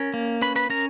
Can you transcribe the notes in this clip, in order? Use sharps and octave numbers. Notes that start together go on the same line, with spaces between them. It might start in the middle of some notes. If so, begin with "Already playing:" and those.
Already playing: C#4 A#4
A#3
C#4 B4 B5
B4 B5
C#4 A#4 A#5